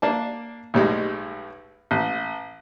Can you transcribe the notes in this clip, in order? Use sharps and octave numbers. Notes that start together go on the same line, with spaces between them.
A#3 D4 A5
B1 A2 G3 G#3
A1